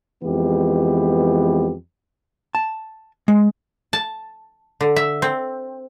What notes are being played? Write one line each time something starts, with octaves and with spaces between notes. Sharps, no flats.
F2 E3 G#3 B3 G4
A5
G#3
A5
D3
E5
C4